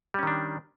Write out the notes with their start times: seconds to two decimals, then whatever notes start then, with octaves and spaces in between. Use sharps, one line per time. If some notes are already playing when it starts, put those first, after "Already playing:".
0.14 G3
0.19 C#4
0.23 D#3
0.27 D4